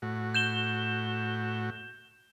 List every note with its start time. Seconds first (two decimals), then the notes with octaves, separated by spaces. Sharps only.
0.02 A2 F#4
0.34 G6 E7 G7